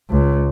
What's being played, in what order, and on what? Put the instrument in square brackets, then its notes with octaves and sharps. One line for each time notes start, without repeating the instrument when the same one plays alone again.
[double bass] C#2